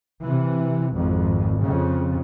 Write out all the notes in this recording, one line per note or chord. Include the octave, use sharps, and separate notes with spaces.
C3 E3
G#1 F2
F2 C#3